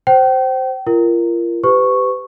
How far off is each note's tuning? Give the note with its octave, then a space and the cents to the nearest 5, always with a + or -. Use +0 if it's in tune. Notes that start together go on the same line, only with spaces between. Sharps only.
C5 +0 G5 -35
F4 -35 A#4 +0
G4 +0 B4 +35 C#6 -5